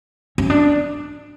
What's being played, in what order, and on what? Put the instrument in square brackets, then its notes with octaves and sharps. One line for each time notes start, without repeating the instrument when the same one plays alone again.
[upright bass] C#4
D4